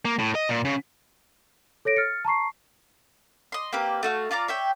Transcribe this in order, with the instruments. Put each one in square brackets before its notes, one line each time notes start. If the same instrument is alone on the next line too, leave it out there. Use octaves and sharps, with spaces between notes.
[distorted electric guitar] A#3
A2
D#5
A#2
C#3
[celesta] A4 C#5 A#6 D7
F6 A6 C#7
A5 A#5 C#6 C7
[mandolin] D#5 C6
A#3 C4 G4 B4
A3 F#4 F5
F4 D5 F5 A#5
C#5 E5 G5